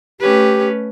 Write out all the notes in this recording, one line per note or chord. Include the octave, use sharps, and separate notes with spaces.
A3 C#4 G4 B4